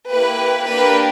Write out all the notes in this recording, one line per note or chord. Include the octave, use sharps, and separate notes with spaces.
A#3 E4 G4 B4
A#3 D4 G4 B4